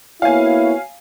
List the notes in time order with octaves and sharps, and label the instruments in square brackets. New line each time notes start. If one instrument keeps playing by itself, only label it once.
[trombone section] A#3 B3 E4 [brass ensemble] F#4 C#5 [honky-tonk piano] F5 G#5